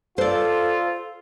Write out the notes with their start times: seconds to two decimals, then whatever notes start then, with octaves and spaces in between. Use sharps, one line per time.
0.18 F4 A4 C5 D5